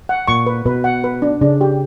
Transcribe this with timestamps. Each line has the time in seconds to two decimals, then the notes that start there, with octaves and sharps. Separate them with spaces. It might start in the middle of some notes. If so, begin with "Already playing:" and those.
0.09 F#5
0.28 A#2 C#6
0.46 B4
0.65 B2 B4
0.84 F#5
1.04 B4
1.22 D4
1.41 C#3 D4
1.61 G4